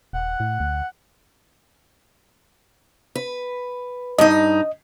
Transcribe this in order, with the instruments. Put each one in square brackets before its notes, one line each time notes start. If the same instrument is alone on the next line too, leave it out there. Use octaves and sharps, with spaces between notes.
[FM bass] D#1 [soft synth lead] F#5
[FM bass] A2
D2
[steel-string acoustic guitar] B4
[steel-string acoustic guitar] G2 D#4 [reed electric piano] D#5